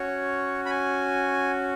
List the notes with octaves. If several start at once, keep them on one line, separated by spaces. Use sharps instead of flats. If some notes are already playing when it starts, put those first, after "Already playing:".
Already playing: C#4 F#4 C#5
B5
G#5